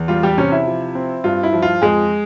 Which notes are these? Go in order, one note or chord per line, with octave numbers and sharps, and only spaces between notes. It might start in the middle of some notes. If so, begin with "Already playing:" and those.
Already playing: E2
G3 F4
G3 G4
C3 C#4 C#5
E4 E5
F3
C4
G2 F4
E4
F3
F4
F2 G#3 G#4